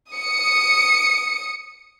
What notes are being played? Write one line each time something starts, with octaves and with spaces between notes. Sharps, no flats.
D#6 C#7